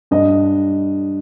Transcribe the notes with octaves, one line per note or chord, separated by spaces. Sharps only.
G2 D#5